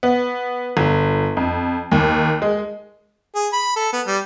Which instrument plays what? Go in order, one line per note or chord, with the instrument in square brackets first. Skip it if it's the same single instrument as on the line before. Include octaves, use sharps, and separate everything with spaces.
[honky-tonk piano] B3
G1
F2
D#2
G#3
[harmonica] G#4
B5
A4
B3
G3